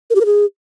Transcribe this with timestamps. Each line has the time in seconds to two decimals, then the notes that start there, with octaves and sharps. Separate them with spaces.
0.10 A#4
0.15 G4
0.21 A#4
0.26 G#4